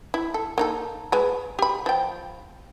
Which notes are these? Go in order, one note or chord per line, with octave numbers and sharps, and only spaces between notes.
E4
A4
A#3 D#4 A4
G#3 B4
G4 B5
F3 G5